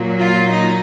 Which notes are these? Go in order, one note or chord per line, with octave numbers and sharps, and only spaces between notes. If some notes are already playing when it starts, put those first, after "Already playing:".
Already playing: A#2 F#3
F4
D#4